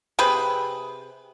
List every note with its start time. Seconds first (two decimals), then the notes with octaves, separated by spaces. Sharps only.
0.19 C3 C4 G#4 B4